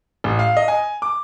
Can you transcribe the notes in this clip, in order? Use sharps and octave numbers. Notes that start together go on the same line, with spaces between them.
A1
F5
D#5
G#5
D6